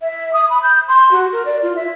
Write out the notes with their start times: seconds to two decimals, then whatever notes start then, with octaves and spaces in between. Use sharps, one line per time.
0.01 E5
0.33 D#6
0.49 B5
0.63 G6
0.88 C6
1.11 F#4
1.32 A#4
1.45 D5
1.62 F4
1.75 E5